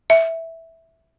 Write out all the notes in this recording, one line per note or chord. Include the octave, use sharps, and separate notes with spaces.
E5